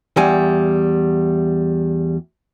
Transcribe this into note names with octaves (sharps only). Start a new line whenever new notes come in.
E2 G3 G#5